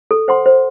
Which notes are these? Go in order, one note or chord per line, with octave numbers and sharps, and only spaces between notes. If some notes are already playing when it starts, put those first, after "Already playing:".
A4
C5 F#5 C6
C5